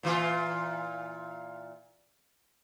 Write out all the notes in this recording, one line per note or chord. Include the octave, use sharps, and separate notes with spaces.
A#2 E3 F4